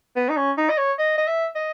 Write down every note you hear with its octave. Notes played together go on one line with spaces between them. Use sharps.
B3
D#4
C#4
D#4
D#5
C#5
D#5
D#5
E5
D#5